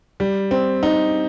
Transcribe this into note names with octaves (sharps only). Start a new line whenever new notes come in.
G3
C4
D#4